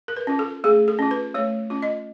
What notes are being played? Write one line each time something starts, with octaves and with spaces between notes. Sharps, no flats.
A#4
B4
C#4 F4
A4
A3 G#4
A4
C#4 F4
B4
A3 C#5
C#4 F4
D#5